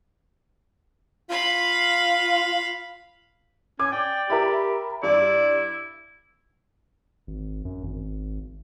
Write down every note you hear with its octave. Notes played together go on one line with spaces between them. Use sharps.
F4 F5 B5
C#4 G#5 D6
D5 G5
G4 A#4 E5 B5
G2 E4 D5
G#1
F#2
G#1